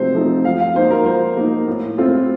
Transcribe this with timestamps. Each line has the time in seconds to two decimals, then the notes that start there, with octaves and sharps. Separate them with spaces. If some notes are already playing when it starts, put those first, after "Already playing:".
Already playing: C3 F3 A3 C4 D#4 C5
0.14 F3 A3 C4 D#4
0.45 F3 F5
0.60 F5
0.75 A#3 D#4 C5
0.91 A#4
1.05 F3 C5
1.37 A#3 D#4
1.68 A2
1.98 A3 C4 F4